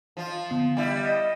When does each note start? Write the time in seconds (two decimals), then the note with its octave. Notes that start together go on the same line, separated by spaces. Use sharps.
0.17 F3 F4
0.50 D3 B3 C7
0.77 G3 E4
1.04 D#5 F6 C#7 E7